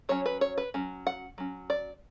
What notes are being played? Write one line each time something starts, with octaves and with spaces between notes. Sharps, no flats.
F#3 C#4 C#5
B4
C#5
B4
F#3 C#4
F#5
F#3 C#4
D5